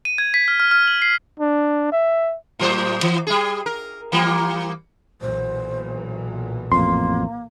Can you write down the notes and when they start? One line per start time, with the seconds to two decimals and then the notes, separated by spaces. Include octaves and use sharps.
0.05 D#7
0.18 G#6
0.34 B6
0.48 F6
0.60 F6
0.71 F6
0.88 F#7
1.02 C7
1.40 D4
1.92 E5
2.59 A2 F#3 C5
3.03 E3
3.27 G3 G#4
3.66 A#4
4.12 E3 G3 A#3
5.20 B1 A#2 E3 C5
6.72 A1 F2 A#3 C6